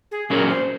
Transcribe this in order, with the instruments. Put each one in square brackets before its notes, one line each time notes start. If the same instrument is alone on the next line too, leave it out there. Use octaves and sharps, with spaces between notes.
[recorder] G#4
[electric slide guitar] A#2 F#3 C#4 G#4 [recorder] A#4
[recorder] C5